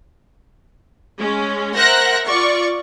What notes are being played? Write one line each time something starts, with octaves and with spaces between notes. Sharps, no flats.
G#3 C#4
A#4 C5 E5 F#5 F#6 A#6
F4 D5 C#6